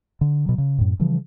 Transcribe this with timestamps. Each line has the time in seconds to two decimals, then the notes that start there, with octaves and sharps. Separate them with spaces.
0.21 D3
0.46 B2 F#3
0.58 C#3
0.78 F#2 A2
0.99 C#3 E3 F3 G3